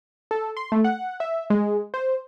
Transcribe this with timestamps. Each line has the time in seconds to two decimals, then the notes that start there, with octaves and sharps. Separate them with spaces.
0.31 A4
0.57 C6
0.72 A3
0.84 F#5
1.20 E5
1.50 G#3
1.94 C5